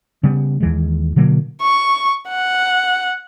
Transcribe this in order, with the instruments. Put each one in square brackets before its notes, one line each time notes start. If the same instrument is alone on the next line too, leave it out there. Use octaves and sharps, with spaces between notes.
[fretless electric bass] C#3 G3 B3
D#2 E3 G#3
B2 D3 F#3 A#3
[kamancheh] C#6
F#5